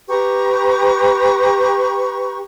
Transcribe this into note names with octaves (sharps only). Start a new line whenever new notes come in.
G4 B4 A#5 C#6